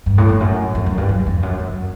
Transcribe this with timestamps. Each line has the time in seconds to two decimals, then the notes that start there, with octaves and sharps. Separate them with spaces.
0.06 G2
0.18 A2
0.29 F2
0.40 F#2
0.75 F2
0.86 F#2
0.98 G2
1.09 F#2
1.26 F2
1.43 F#2
1.60 F#2